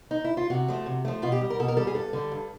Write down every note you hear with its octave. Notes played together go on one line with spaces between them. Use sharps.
D#4
E4
F4
C3 F#4
F3 A3
C3
F3 A3
B2 F4
G4
G3
A#4
B2 A4
A#4
G3 A4
G#4
G2 A4
D3 G3
G2